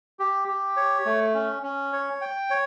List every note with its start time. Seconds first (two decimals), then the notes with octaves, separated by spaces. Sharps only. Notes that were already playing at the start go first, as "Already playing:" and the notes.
0.19 G4
0.48 G4
0.77 C#5
1.06 A3
1.35 C#4
1.63 C#4
1.93 C#5
2.21 G5
2.50 C#5